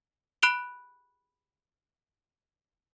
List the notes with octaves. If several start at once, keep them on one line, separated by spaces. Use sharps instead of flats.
B5 F#6 D7 F7 G7